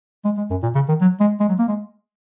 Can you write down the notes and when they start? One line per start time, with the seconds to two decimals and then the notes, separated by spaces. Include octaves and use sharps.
0.25 G#3
0.37 G#3
0.51 F#2
0.63 A#2
0.75 C#3
0.88 D#3
1.01 F#3
1.20 G#3
1.40 G#3
1.48 F#3
1.59 A#3
1.68 G#3